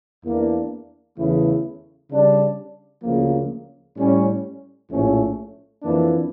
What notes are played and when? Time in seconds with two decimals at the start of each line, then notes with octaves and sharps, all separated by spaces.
0.23 E2 E3 A#3 D4
1.17 E2 C#3 E3 A3 E4
2.09 C#3 G3 D4
3.02 D2 C#3 F3 A#3
3.96 A2 G3 C#4
4.89 A#1 A2 F3 A3 C#4
5.82 F2 E3 A#3 D4